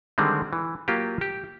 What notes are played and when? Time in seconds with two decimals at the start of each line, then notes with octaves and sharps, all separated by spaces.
0.18 D3 D#3 G3 G#3 C4
0.53 E3
0.88 F#3 A#3 F4 G4
1.21 G4